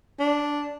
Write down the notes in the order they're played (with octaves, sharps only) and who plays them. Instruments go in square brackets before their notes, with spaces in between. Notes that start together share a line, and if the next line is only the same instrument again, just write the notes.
[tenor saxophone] D4